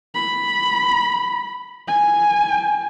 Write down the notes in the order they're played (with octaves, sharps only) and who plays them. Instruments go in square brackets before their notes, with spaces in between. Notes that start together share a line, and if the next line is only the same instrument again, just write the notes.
[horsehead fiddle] B5
G#5